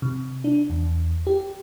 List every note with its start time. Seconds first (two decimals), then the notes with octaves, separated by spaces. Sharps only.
0.02 C3
0.44 D4
0.70 E2
1.27 G4